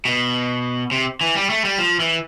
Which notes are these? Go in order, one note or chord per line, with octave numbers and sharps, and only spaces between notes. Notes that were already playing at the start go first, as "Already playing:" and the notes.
B2
C3
E3
G3
A3
G3
F3
E3